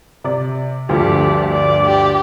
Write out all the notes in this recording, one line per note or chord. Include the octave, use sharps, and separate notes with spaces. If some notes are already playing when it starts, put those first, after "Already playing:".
C3 D5
D2 G2 F3 G4 D5
D5
G4